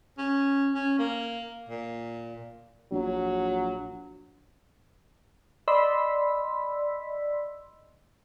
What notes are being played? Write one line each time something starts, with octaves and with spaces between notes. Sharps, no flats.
C#4
C#4
A#3
A#2
A#1 F#3
D5 D#5 B5 C6 E6 B6